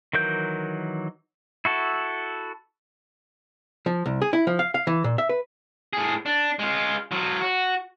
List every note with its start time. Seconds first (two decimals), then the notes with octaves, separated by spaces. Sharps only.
0.13 D#3 E3 F#3 A#4 G6
1.65 E4 F#4 A4
3.86 F3
4.06 C2
4.22 G#4
4.33 E4
4.47 F3
4.59 F5
4.74 F5
4.87 E3
5.04 A#2
5.18 E5
5.29 B4
5.93 A2 G#4
6.26 D4
6.59 G#3 F4
7.11 F#3 F4
7.41 F#4